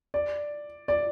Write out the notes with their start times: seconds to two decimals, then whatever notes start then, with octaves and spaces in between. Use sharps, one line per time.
0.14 D5
0.88 D5